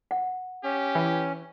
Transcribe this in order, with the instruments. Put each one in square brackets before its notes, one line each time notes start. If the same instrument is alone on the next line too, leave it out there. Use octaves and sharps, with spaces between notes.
[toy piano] F#5
[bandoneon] C#4 [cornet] G4
[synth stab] E3